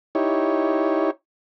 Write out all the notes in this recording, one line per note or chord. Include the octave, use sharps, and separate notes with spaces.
D#4 E4 G4 C#5